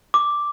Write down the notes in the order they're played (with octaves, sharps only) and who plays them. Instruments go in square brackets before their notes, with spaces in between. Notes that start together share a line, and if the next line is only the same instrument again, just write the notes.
[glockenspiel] D6